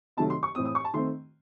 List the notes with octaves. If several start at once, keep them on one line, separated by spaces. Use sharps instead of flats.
C3 D#3 F#3 A3 A5
C6
C#6
A2 E3 C4 D#6
D#6
C#6
A5
D#3 A3 C4 C6